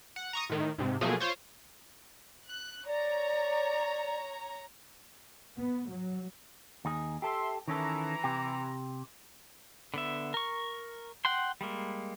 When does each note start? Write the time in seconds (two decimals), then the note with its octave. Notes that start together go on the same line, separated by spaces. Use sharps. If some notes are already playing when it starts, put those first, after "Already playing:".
0.16 F#5
0.33 A#5 C#6 D#6
0.50 A2 D#3
0.78 G#2 C3
1.01 B2 F3 F#3 A3 A#3 G#4
1.20 F4 C5 C#5
2.48 F#6
2.86 C#5 D5 A#5
5.57 B3
5.89 F#3
6.85 D#2 D#4 G#4
7.22 G4 A4 E5 C6
7.68 D#3 E3 C#4 A4 A#5
8.24 C3 G4
9.94 D3 B3 E5
10.34 A#4 C#6
11.25 F#5 G5 C6
11.61 G3 G#3 A#3